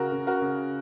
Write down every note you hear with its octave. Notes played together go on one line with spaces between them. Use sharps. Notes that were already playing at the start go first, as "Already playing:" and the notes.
Already playing: C#3 F#4 A#4
C#3
F#4 A#4
C#3